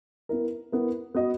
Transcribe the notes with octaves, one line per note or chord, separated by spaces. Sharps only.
B3 E4 A#4
B3 E4 A#4
B3 F#4 B4 D#5